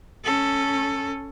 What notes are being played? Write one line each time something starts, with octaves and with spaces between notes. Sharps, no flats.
C#4 A4